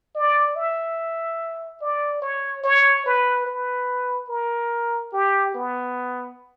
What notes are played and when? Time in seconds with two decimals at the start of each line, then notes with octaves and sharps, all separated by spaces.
0.15 D5
0.56 E5
1.81 D5
2.22 C#5
2.64 C#5
3.06 B4
3.46 B4
4.30 A#4
5.13 G4
5.54 B3